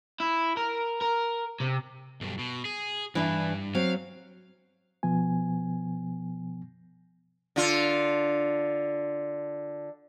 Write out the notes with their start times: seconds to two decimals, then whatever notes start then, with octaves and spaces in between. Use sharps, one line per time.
0.20 E4
0.57 A#4
1.02 A#4
1.61 C3
2.21 B1 G2
2.39 B2
2.65 G#4
3.15 G2 E3 D4 E4
3.75 F#3 C4 F5
5.03 B2 F3 B3 G#5
7.56 D3 F4